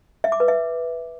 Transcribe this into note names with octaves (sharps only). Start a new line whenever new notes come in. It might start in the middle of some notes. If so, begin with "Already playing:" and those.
E5
D6
B4
E5